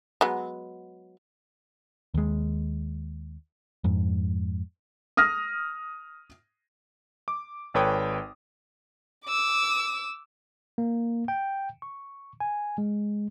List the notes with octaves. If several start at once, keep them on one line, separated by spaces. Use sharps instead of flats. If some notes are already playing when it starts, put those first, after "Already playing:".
F#3 G#3 B3
D#2 G#3
F2 G#2
D#6 F6 A#6
D6
G#1 A4 B4 C#5 G5 D#6
D6 E6
A#3
G5
C#6
G#5
G#3